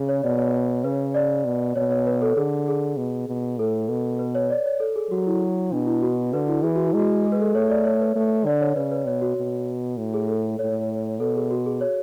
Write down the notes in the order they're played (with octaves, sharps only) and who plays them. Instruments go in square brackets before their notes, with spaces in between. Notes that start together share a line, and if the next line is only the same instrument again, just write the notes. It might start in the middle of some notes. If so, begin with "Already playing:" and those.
Already playing: [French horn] C#3 [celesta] G#4
[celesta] C#5
[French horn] B2 [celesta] D5
[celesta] C#5
[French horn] C#3 [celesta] B4
[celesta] D5
[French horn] B2
[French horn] B2 [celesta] C#5
[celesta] C#5
B4
A4
[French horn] D3 [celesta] G#4
[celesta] G#4
[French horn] B2
B2
[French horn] A2 [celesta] A4
[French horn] B2
[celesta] B4
C#5
D5
C#5
A4
G#4
[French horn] F#3 [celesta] F#4
[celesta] E4
[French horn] B2 [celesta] D4
[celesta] E4
F#4
[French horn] D3 [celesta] B4
[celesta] E4
[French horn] E3 [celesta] G#4
[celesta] F#4
E4
[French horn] G#3
[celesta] F#4
G#4
B4
A4
[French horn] A3 [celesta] C#5
[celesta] D5
C#5
B4
[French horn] A3
[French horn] D3 [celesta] D5
[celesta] C#5
[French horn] C#3 [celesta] B4
[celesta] B4
[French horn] B2 [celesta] C#5
[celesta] F#4
[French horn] B2
A2
[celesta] G#4
A4
[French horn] A2 [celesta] C#5
[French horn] B2 [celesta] A4
[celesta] G#4
F#4
G#4
C#5